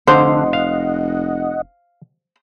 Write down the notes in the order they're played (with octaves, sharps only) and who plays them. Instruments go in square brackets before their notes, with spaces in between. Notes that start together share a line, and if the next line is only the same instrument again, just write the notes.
[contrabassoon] F1 [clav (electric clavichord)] D3 F5 [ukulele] C5 [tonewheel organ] D#5 F#5
[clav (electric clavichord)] F5